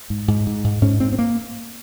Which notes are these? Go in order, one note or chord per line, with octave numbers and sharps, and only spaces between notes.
G#2
G#2
G#2
G#2
G#2 C#4
G#2 C4
C4
A#3